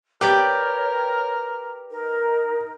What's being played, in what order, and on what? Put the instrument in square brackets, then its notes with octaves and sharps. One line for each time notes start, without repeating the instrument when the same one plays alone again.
[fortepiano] G4 [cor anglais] A#4 [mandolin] B4 D5 G5 [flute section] C#5
[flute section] D#4 A#4